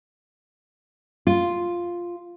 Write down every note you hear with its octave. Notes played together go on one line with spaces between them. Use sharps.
F4